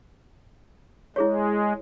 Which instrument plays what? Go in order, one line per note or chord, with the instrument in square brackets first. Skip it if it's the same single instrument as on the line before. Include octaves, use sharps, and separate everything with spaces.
[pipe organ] G#3 [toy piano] E4 G#4 C#5